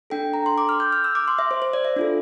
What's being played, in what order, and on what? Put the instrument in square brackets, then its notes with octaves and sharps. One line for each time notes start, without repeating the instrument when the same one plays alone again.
[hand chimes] D4 A4 G5
A#5
C6
D6
F6
G6
F6
E6
D6
C6
E5
C5
C5
D5
E5
D4 F4 A4